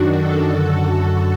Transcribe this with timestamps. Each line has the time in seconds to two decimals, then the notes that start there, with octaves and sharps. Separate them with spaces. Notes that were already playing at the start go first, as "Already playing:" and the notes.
Already playing: F#2 D#3 D4 F#4
0.16 F#4 A4
0.46 F#2 D3